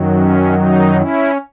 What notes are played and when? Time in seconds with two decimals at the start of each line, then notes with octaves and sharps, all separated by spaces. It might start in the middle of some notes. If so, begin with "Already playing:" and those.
Already playing: F#2 D#3 F#3
0.11 C#4
0.53 D#4
0.94 C#4 E4